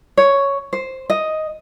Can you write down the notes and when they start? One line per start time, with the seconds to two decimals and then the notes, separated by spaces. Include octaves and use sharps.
0.18 C#5
0.73 C5
1.10 D#5